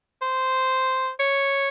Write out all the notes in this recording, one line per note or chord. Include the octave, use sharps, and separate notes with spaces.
C5
C#5